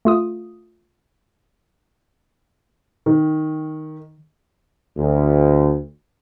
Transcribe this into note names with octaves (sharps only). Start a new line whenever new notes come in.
A3 F4 D#6
D#3
D2